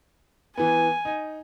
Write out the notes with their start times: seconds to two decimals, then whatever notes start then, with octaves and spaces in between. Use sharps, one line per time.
0.57 E3 B3 G#5
1.05 D#4